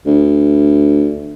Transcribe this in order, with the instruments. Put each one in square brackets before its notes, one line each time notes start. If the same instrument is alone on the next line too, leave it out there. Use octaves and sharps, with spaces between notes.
[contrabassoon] D2